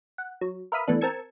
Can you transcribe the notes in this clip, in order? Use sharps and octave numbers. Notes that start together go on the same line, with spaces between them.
F#5
F#3
A#4 B4 E5 F5 B5 D#6
E3 A3 B3 D4
C4 A#4 A5 E6 G#6 C#7